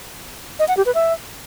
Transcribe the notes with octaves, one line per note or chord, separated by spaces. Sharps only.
D#5
F#5
G4
B4
E5